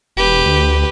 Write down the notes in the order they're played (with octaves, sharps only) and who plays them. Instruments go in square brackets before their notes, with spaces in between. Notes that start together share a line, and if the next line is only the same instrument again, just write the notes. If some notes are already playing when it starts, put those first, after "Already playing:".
[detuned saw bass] E1 [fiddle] G4 B4
[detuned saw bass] D2